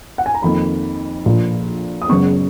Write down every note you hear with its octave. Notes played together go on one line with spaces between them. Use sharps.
F#5
G#5
A#5
F2 D#3 A#3 B5
A#1 A#2 F3
D#6
F#1 F#2 C#3 G#3 B3 C#6